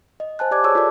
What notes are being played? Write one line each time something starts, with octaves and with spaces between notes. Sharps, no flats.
D#5
C5 G#5 A5 F#6
G4 D5 D6 G#6
F#4 G#4 C#5 A5 C#6 E6
F4 A4 C#5 D5